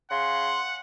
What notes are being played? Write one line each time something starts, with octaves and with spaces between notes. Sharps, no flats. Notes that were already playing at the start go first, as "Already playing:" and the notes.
C#3 F#5 C6